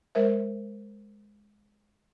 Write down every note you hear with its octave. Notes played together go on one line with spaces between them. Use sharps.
G#3 A#4 C5 E5